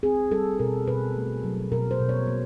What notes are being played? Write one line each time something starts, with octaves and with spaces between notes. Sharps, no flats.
C4 G#4
G3 A4
B2 A#4
B2 B4
A3
F#3
B2 A#4
C5
B2
C#5
A#3